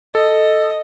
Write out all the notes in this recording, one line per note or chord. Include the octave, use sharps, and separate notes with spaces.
A4 D#5